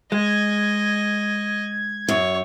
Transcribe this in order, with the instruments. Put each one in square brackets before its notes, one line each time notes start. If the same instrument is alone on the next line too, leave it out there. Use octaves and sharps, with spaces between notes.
[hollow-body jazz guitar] G#3 [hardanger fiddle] D#5 [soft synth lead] G#6
[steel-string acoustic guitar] F#2 [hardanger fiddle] C#5